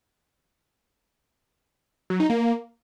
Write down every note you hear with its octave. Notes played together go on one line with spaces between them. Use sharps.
F#3
D#4
A#3